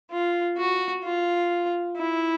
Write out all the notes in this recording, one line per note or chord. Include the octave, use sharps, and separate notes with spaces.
F4
F#4
F4
E4